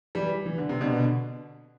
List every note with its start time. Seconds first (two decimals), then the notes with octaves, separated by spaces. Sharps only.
0.15 E3 G3
0.46 E3
0.58 D3
0.69 C3
0.81 B2 D3